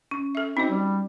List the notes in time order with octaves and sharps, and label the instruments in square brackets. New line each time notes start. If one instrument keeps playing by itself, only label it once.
[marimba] C#4
[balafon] A4 E5
[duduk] C4 [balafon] D#4 F#4 D#5
[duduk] G3